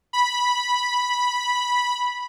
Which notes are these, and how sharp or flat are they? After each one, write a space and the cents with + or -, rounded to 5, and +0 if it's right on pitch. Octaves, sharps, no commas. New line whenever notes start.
B5 -10